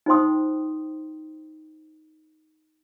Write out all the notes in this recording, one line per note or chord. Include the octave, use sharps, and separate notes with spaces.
D#4 F4 C5 G5 C6 D#6